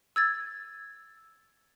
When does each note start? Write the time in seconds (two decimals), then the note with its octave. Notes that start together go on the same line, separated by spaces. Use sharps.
0.16 E6 G#6 A6